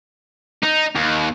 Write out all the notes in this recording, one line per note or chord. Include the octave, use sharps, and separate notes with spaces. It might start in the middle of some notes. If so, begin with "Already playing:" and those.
D#4
D#2